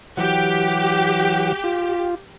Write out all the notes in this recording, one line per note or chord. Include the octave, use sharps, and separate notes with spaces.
E3 F#3 G4 F#5
F4